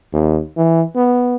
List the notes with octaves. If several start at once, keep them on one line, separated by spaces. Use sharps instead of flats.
D#2
E3
B3